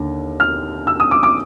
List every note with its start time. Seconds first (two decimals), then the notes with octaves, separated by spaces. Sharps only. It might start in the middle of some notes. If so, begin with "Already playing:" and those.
Already playing: D#2 D3
0.40 F6
0.87 E6
1.00 D#6
1.11 D6
1.23 D6